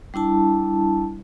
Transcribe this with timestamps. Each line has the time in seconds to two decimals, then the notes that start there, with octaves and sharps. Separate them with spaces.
0.14 G3 D4 E4 A5